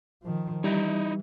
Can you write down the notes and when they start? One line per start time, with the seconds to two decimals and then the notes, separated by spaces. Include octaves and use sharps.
0.23 D#3 F3
0.64 E3 G3 D#4 E4 D#5